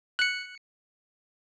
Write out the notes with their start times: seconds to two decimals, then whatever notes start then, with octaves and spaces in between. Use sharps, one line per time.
0.19 F#6 C#7